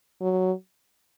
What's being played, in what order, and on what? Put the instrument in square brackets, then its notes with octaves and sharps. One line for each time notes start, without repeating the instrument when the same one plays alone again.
[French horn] F#3